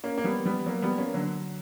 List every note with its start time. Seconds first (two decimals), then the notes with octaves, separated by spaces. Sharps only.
0.04 A#3 C#4
0.18 A#3
0.24 G3 B3
0.46 G3 B3
0.66 F#3 A#3
0.82 G3 B3
0.98 A#3 C#4
1.14 D3 F#3